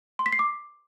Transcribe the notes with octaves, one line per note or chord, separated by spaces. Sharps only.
C6
B6
C7
D6